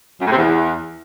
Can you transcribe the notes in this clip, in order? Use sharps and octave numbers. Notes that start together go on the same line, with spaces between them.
F#2
A2
C3
E2